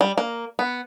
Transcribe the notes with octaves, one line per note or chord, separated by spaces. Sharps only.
G3
A#3
B3